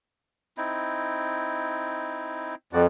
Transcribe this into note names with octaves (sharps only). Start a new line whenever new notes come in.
C4 D#4 E4
F2 F#4 D5